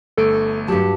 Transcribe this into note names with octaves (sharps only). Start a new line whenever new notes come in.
G1 A3 A4 D7
G2 F#3 G4 A5